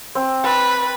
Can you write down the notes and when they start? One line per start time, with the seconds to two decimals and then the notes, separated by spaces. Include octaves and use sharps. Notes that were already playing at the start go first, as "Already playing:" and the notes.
0.15 C4
0.44 B4 A5